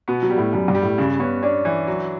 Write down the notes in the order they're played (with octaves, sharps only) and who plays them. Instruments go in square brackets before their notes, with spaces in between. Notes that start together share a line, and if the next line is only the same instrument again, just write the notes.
[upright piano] B2 [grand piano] B3
[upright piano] F#3
[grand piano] G3
[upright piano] A2
[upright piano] F#2 [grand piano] G3
[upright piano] G2
[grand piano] G3
[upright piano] A2
[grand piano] G2 [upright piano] C#3
[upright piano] B3 [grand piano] C#4
[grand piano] C#4 [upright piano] D4
[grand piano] E3
F#3